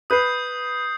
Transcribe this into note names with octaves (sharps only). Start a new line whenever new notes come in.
B4 D#6 G6 C7